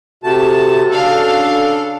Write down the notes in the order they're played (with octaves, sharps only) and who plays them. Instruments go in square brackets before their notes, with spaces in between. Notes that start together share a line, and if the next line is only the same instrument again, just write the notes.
[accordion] C3 A3 A5 [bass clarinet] F#4
[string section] C#3 D4 F5 [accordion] A4